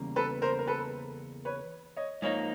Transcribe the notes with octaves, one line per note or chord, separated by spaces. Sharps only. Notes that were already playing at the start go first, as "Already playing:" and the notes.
Already playing: E2 C#3 G3 A#3
A4 B4
A#4 C5
A#4
A4 B4
B4 C#5
C#5 D#5
G#2 F3 A#3 D#4 C#5 D#5